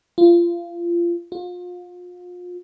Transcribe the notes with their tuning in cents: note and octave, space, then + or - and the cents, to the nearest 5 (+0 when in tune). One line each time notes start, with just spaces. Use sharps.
F4 -25
F4 +35